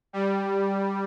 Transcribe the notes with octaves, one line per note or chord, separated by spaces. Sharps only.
G3